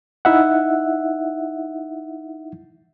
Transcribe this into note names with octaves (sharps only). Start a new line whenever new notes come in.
D#4 E4 E5 F#5